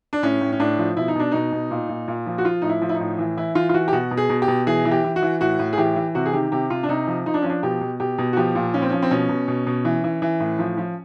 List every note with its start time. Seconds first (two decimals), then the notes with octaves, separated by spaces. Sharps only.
0.13 D4
0.23 A2 C#4
0.41 A2
0.52 C#4
0.60 A2 D4
0.78 F3
0.96 B2 E4
1.08 D#4
1.15 B2 D4
1.32 B2 D#4
1.52 B2
1.71 A#2
1.89 A#2
2.08 A#2
2.26 F3
2.38 F#4
2.45 F3 F4
2.62 A2 D#4
2.69 E4
2.82 F3
2.89 E4
2.94 D#4
3.00 A2
3.18 E3
3.37 E3 E4
3.55 E3 F4
3.69 F4
3.74 E3 F#4
3.88 G4
3.93 B2 F#4
4.11 B2
4.17 G#4
4.29 B2
4.42 G4
4.48 B2
4.67 E3 G#4
4.85 E3
4.91 G4
5.04 E3
5.16 F#4
5.22 E3
5.41 A2 F#4
5.59 A2
5.73 G#4
5.78 E3 G4
5.96 E3
6.15 C3 F#4
6.26 G#4
6.33 D#3 G4
6.52 C3 G4
6.70 C3 F4
6.83 D4
6.89 C3 D#4
7.07 F3
7.26 F3 D#4
7.34 D4
7.42 F3 C#4
7.50 D4
7.63 B2 G4
7.81 B2
8.00 B2 G4
8.18 B2
8.33 F#4
8.37 F3 G4
8.55 A#2
8.74 F3 C#4
8.82 C4
8.90 F3 C#4
9.02 C4
9.11 B2 C#4
9.29 B2
9.48 B2
9.66 B2
9.85 E3
10.04 E3
10.22 E3
10.40 A2
10.59 F3
10.77 F3